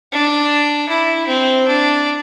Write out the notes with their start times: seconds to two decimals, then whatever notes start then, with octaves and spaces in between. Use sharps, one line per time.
0.12 D4
0.89 E4
1.27 C4
1.67 D4